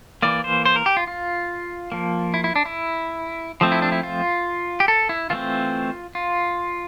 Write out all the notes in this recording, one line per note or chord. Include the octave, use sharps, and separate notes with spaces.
E3 A#3 D5
C5
C5
A#4
G4
F4
F4
F3 A#3
E4
E4
D4
E4
F3 A3 C4
E4
D4
E4
F4
G4
A4
E4
E3 A3 C4 F4
F4